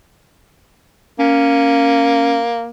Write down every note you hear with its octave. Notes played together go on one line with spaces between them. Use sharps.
A#3 C#4